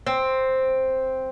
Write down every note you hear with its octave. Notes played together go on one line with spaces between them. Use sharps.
C4